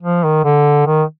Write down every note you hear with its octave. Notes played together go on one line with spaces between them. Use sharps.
F3
D#3
D3
D#3